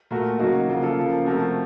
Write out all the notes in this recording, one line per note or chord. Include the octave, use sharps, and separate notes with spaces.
A#2 A3 F#4 A#4
C#3 F#3 A#3 D#4 F#4
C#3 F3 A#3 F4
F4 A4
C#3 F3 A#3
C3 F3 A3 F#4 A#4